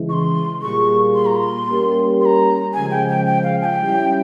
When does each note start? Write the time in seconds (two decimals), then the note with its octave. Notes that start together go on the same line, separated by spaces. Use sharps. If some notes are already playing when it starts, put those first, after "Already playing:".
Already playing: C#3 E3 G#3 E4
0.09 C#6
0.13 C6
0.62 A#2 G3 A#3 F4 G#4 C#6
1.14 C6
1.26 A#5
1.36 C6
1.68 G3 A#3 C#4 G4 A#4
2.21 C6
2.25 A#5
2.73 C#3 F3 G#3 G#5
2.91 G5
3.08 G5
3.26 G5
3.44 F5
3.61 G#5
3.65 G5
3.79 G3 C#4 E4